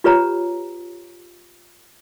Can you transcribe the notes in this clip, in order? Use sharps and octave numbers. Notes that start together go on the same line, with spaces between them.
F4 G4 B4 C#5 A#5